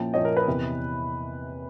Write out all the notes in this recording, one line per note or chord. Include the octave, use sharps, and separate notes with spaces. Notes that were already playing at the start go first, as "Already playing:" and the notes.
Already playing: A#2 F3 A#3 C#4 E4 G5 A5
A#2 F3 A#3 C#4 E4 C#5 D#5
A#4
B4
E2 C3 E3